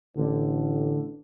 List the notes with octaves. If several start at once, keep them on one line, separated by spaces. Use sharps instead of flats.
A1 D3